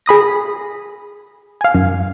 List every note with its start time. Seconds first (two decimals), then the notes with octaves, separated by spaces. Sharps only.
0.06 G#4 B5 D#6 A#6
1.61 F5 G#5
1.74 F#2